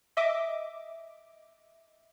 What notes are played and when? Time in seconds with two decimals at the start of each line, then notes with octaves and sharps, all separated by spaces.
0.17 D#5 E5 D6